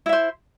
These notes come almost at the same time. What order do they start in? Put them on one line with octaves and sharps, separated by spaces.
E4 E5 C5